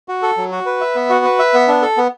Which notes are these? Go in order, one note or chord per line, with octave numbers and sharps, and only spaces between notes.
F#4
A4
F#3
F#4
B4
E5
B3
F#4
B4
E5
B3
D4
A4
B3